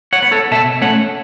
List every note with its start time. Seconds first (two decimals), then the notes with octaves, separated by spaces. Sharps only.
0.13 C#5 F#5
0.22 B3
0.32 A4 C#5
0.51 B2 E5 A5
0.81 A3 C#4 C#5 F#5